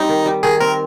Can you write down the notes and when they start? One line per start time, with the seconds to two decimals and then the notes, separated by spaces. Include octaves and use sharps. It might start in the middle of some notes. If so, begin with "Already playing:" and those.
Already playing: G3 C4 D#4
0.09 D#3
0.26 G3
0.43 D#3 G#4
0.61 C4 A#4